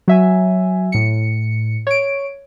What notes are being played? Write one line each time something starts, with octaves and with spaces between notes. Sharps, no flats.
F#3 E5 G#5
A2 C#7
C#5 D7